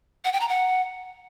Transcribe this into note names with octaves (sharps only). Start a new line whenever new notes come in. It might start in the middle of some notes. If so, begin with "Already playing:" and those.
F#5
G5
A#5
F#5